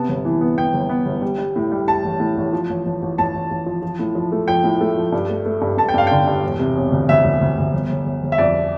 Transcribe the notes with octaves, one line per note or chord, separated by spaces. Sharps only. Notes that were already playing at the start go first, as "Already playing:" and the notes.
Already playing: C3 B3 A5
G1
E3
B3
B3 G5
G1
B3
G1
G3
G3
A2
G3
G3 A5
A1
A2
A1
F3
A1
A1
A1
A1 A5
A1
A1
F3
F3
A2
F3
A3
F3 G5
A2
A3
F3
G2
A3
A3
G2
G2 A5
G5
G2 F5
D3 G5
G2
E1
C3
E1
D2
D2 E5
D2
D2
D2
G1
G1
G1
G1
E5
F2 D5